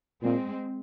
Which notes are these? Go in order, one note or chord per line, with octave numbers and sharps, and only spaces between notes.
A#2 G#3 C4